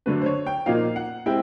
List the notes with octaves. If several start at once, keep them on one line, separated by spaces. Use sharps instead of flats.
D3 F#3 A3 D4 B4
C5
C#5
G5
A#2 F3 A#3 D#4 F5
F#5
G#3 C4 E4 G5